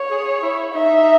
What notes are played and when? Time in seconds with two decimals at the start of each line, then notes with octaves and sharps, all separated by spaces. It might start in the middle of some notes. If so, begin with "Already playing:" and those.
Already playing: C#5
0.10 G#4
0.41 E4
0.74 D#4 E5